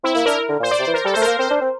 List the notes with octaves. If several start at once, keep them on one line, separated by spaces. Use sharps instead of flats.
C4 E4
A#3 E4
D4 A#4
D3
A#2 C5
D5
C3
C5
E3
A#4
G3 A4
A3 C5
A#4
A#3
C4 C5
D4
C4